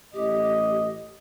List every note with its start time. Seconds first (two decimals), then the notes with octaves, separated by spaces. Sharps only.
0.14 A1 G4 D#5